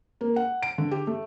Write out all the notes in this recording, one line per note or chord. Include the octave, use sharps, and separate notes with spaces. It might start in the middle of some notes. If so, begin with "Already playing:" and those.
A#3
F#5
D7
D3
G4
A3